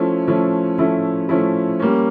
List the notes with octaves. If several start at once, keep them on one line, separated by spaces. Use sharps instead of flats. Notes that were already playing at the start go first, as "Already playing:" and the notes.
Already playing: F3 A3 C#4 E4
F3 A3 C#4 E4
F3 A3 C#4 E4
F3 A3 C#4 E4
G3 A#3 C#4